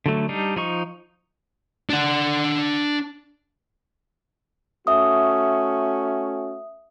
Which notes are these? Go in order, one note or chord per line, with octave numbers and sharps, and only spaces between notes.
D3 F#3 A3
G3 D4 D#4
F3 D#4 C#6
D4 F#5
A3 C#4 F#4 E5 D#6